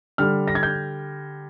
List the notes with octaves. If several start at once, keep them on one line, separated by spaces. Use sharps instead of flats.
D3 G3 F6
A#6
G#6
G6